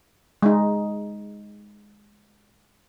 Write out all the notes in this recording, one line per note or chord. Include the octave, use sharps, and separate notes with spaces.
G#3 D#4